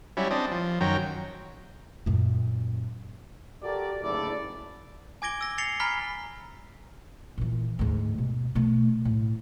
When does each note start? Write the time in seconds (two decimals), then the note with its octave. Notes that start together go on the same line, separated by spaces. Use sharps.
0.17 F#3 G3 C#4 E4
0.31 C4 D4 D#5
0.51 F3
0.81 F#2 D#3 F#3 G5 A#5
2.06 F#2 A#2
3.64 F#4 G4 A4 A#4 D5
4.02 F#1 D2 G#2 E4 A4 D5
5.22 G#5 D6 G#6 A#6 D7 G7
5.41 E6 A#6
5.58 A6 A#6 C7 C#7 F7 G7
5.80 G#5 A#5 B5 F6 B6 G7
7.38 A#2 E3
7.79 D2 G#2
8.18 B2
8.55 B2 A3
9.05 A2